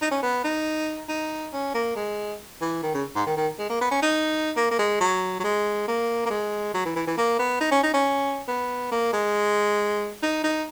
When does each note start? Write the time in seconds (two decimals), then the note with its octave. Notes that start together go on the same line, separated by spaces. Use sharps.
0.02 D#4
0.11 C#4
0.22 B3
0.44 D#4
1.09 D#4
1.53 C#4
1.74 A#3
1.96 G#3
2.61 E3
2.83 D#3
2.94 C#3
3.15 G#2
3.27 D#3
3.37 D#3
3.59 G#3
3.70 A#3
3.81 B3
3.91 C#4
4.02 D#4
4.57 A#3
4.71 A#3
4.79 G#3
5.00 F#3
5.40 F#3
5.44 G#3
5.88 A#3
6.26 A#3
6.30 G#3
6.74 F#3
6.85 E3
6.96 E3
7.07 E3
7.17 A#3
7.39 B3
7.61 D#4
7.72 C#4
7.83 D#4
7.93 C#4
8.48 B3
8.92 A#3
9.13 G#3
10.22 D#4
10.44 D#4